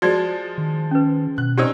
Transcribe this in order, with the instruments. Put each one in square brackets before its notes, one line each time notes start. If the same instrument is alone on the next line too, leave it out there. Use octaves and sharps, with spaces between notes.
[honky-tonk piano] F3 G#3 [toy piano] F#4 D5
[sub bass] D#3
[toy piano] C#4 B4
[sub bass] B2 [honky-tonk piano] F#6
[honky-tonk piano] C4 C#4 D#4 [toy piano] G4 D5 E6